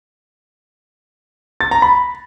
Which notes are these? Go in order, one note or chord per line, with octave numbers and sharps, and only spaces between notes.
A6
A#5
B5